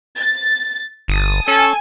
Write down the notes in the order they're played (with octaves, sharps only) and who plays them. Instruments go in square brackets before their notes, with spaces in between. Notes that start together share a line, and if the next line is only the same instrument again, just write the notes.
[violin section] A6
[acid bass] G1 [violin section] A5 D#6
[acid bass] C#4 [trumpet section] A4 [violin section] G#5